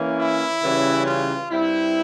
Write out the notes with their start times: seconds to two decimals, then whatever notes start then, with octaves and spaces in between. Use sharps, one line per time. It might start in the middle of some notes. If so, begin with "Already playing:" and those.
Already playing: E3 A#3 C#4
0.18 E4
0.62 C#3 E3 G3 C#4
1.06 F4
1.50 G2 G3 C4 E4